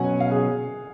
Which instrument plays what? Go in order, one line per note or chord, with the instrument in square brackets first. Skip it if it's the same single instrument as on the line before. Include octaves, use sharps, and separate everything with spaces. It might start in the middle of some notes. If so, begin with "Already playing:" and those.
Already playing: [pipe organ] B2 F#3 C#4 [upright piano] F#5 G#5
[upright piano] F5
G#4